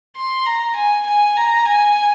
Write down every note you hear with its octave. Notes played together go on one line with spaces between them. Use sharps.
C6
A#5
G#5
G#5
A#5
G#5